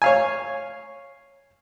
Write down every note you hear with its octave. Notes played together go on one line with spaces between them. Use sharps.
C#5 F5 G#5